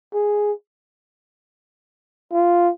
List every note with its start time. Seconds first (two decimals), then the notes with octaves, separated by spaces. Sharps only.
0.14 G#4
2.32 F4